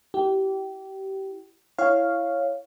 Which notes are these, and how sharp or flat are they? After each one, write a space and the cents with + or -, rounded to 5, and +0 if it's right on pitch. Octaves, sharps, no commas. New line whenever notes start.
E4 +0 G4 -25
E4 +10 C#5 +0 F5 +0